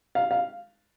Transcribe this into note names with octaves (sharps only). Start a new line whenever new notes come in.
F5
F5